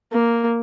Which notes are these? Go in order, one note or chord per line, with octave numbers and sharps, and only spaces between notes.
A#3